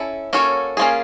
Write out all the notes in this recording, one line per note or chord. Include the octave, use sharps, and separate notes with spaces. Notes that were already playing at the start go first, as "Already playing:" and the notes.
Already playing: C#4 E4 A4
A#3 C#4 F#4 A4 C#5
A#3 C#4 F4 G#4